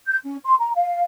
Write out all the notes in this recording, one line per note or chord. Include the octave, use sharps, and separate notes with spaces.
G6
C#4
C6
A#5
F5